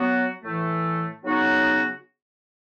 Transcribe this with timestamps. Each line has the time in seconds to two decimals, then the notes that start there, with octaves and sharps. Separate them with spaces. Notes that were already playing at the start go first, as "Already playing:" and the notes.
Already playing: F#3 B3 F#4
0.42 A2 E3 A3
1.24 C#3 F#3 B3 D#4 F#4